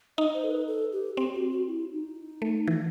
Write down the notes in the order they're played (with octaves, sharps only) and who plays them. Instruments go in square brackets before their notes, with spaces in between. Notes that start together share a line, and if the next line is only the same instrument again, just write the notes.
[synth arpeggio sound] D#4 [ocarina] D#5
[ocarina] C5
A4
B4
A4
G4
[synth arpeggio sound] C4 [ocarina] G4
[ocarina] F#4
F#4
E4
D#4
[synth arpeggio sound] A3
E3